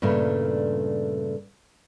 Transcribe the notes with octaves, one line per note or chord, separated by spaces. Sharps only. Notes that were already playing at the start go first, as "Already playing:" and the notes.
G2 A#2 C#3 A3 D4